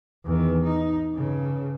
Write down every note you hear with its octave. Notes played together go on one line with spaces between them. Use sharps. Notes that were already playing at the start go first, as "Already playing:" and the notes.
E2 D#3
D#4
G2 C#3